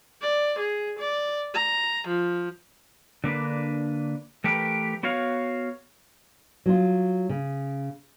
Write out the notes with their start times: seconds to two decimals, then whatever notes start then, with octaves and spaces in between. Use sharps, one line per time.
0.21 D5
0.59 G#4
0.99 D5
1.54 A#5
2.07 F3
3.24 D3 A#3 D4 B4
4.44 E3 A3 G4 A#4 B4
5.03 B3 F#4 C#5 F5
6.66 F#3 F4
7.29 C#3